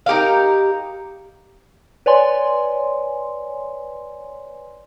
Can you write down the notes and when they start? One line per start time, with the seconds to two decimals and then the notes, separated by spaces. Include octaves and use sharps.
0.06 D#4 G4 A#4 F5
2.06 B4 C#5 D5 G#5 C6